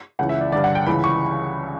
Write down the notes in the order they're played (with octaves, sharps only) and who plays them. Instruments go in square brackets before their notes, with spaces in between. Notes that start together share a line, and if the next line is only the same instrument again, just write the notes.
[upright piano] C#2 C#3 E3 F#5
E5
D5
G2 D3 D5
F#5
G5
C#2 C#3 E3 B5
C#6